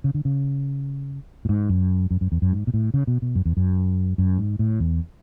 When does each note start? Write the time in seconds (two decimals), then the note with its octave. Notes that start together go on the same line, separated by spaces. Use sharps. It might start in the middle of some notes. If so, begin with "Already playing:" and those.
0.04 C#3
0.14 D3
0.25 C#3
1.45 A2
1.49 G#2
1.69 F#2
2.11 F#2
2.21 F#2
2.32 E2
2.42 F#2
2.52 G#2
2.67 B2
2.74 A2
2.94 C#3
3.07 B2
3.22 B2
3.35 F#2
3.45 E2
3.57 F#2
4.18 F#2
4.38 G#2
4.59 A2
4.80 E2